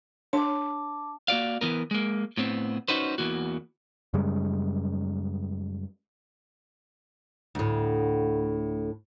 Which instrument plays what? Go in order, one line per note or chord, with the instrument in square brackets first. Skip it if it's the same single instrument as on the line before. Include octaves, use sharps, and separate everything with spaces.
[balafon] D4 C#5 [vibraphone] A5 D6
[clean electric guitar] A#3 F#4 D5 F5
E3 B3 A#4
G#3 A#3
A2 B3 C4
C#4 D#4 F#4 B4 C5
E2 E3 A#3 F#4
[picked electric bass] F#2 C#3 G3 G#3
[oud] D2 A2